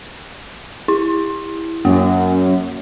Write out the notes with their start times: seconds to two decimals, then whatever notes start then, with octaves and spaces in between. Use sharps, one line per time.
0.88 E4
1.85 F#2 A#3